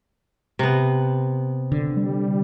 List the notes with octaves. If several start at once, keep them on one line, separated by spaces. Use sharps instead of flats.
C3 B3
D3
G3